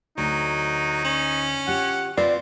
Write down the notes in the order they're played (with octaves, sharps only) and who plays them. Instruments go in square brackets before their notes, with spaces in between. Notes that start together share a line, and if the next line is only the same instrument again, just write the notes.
[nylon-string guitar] D2 [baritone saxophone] F#3 [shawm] D#4
[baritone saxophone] C#4
[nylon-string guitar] F4 G4 [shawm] F#5
[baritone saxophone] C4 [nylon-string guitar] F4 B4 [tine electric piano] D5